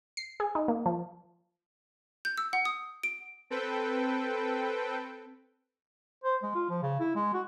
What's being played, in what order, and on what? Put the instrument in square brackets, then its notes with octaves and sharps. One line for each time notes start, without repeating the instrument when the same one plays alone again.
[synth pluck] C7
G#4
D#4
A#3
F3
[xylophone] G6
E6
F#5
D#6
D7
[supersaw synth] C4 A4 B4 G5
[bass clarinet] C5
G#3
F4
F3
C#3
E4
G#3
F#4